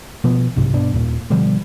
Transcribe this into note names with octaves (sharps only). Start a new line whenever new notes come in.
B2 F3 B3
B1 G#2 C3
G1 B2 D4
D#2 A#2
B2 D3 F3 G3